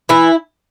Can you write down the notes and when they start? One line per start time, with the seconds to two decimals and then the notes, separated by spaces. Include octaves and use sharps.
0.09 E3 E4